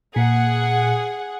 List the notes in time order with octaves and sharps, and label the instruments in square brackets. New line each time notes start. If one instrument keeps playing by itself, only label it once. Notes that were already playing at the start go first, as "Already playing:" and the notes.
[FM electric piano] A#2 [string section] G#4 F#5